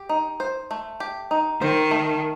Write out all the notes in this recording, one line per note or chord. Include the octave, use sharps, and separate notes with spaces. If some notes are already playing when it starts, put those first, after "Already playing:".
Already playing: G4
D#4
C5
A3
G4
D#4
D#3 C5
A3